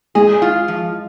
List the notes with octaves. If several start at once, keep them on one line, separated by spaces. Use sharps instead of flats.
G#3 G#4
F4
F3